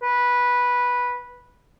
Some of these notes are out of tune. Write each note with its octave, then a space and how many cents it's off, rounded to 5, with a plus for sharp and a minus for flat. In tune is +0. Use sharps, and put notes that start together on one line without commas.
B4 -10